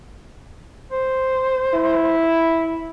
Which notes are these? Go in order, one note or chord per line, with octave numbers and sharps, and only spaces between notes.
C5
E4